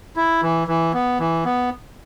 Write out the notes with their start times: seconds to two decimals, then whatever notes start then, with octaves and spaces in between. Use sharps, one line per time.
0.16 E4
0.43 E3
0.68 E3
0.94 B3
1.20 E3
1.45 B3